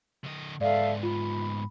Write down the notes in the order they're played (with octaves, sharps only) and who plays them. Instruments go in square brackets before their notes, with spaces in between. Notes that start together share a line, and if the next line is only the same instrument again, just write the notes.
[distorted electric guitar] D3 D#5
[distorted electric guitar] G#2 B3 [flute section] A4 E5 F5 [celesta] D5
[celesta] F4 [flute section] B5